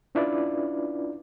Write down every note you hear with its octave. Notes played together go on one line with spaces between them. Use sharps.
C#4 D4 E4 F4 B4 D5